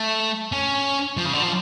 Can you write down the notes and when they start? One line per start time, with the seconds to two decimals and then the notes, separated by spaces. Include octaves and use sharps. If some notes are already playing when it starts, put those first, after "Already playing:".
Already playing: A3
0.52 C#4
1.17 F3
1.26 C#3
1.33 D3
1.42 F3